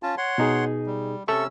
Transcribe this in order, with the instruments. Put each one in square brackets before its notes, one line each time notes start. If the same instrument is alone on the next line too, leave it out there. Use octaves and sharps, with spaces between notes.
[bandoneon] C#4 F4 A5
C#5 F#5 C6
[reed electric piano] B2 D#4 G#4
[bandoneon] G3
[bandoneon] C3 C#4 E6 [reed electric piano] A4 E5 C#6